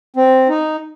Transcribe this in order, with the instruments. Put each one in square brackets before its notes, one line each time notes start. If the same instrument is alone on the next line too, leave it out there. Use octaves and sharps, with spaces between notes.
[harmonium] C4
D#4